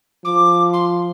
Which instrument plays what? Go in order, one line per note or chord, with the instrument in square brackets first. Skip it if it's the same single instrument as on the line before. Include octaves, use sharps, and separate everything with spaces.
[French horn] F3 [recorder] D6
[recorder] C6